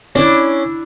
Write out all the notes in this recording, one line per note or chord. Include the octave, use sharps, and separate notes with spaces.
C#4 D4 E4